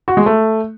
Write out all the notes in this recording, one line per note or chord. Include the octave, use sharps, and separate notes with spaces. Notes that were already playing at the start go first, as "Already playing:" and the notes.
F#4
G#3
A3